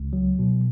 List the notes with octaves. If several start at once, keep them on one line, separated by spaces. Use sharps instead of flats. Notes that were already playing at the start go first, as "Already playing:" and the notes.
Already playing: C#2
F#3
B2